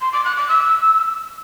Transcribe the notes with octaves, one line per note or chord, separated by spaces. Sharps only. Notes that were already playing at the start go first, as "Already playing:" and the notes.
C6
D6
F#6
D6
E6